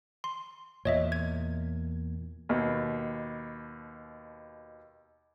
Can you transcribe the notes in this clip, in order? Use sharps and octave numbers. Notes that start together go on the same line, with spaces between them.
C6
E2 A#2 C#5 D#5 E5
G#6
D#2 B2